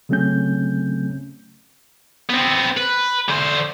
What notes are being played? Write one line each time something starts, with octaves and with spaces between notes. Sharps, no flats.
C#3 F#3 A3 C4 C#4 G6
B3 C4
B4
D3 C5